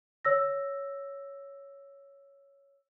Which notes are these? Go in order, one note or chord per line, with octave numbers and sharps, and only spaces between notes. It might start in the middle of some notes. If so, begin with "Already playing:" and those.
C#5 E6 A#6